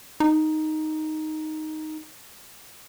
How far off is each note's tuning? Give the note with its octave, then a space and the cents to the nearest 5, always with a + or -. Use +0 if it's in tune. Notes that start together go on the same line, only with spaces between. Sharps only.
D#4 +0